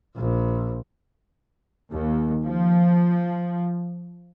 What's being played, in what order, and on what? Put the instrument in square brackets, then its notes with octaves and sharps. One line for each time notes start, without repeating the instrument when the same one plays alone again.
[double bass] A#1
[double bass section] D#2
F3